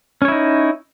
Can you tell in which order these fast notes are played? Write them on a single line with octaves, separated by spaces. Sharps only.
C#4 C#5 E4 D#4